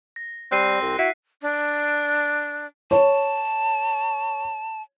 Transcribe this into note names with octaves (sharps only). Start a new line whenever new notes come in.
A#6
G3 C4 F#6 C7 D#7
C2
E4 F#4 B6 D#7
D4
C#5 A5